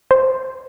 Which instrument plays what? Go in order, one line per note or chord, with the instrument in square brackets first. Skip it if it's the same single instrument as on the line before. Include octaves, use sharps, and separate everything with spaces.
[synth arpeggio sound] C5